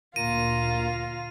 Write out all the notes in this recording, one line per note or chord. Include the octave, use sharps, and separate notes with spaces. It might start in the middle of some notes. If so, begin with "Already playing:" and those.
D2 A#2 A#3 F4 A#5 D#7